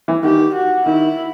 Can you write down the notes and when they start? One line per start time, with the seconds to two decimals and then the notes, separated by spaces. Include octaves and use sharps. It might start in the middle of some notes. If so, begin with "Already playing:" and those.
0.08 E3
0.23 D#3 G4
0.55 F#4
0.86 D#3 E4